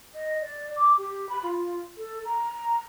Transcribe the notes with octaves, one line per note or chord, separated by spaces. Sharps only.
D#5
D5
D6
G4
B5
F4
A4
A#5